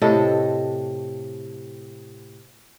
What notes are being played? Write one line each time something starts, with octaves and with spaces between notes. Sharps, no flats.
A2 C3 A4 D#5